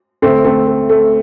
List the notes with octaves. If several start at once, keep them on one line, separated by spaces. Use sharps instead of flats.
D2 D3 A3 C4
A3 C4
A3
A3